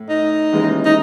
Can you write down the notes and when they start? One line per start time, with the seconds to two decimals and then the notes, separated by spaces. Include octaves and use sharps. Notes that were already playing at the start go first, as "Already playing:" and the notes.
Already playing: A2
0.09 D#4
0.53 D#2 C#3 E3 G#3
0.85 D#4